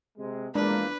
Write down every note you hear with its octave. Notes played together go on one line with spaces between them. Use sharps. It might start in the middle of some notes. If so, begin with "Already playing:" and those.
C3 G#3
E2 F3 G#3 A#3 D4 B4